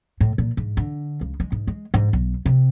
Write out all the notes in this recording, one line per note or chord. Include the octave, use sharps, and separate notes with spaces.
A2
A#2
G#2
D3
C#2
G#3
G#2
G#3
G#2
B1
C3